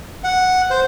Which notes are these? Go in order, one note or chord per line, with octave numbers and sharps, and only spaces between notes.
F#5
C5